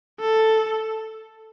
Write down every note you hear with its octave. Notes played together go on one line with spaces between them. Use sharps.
A4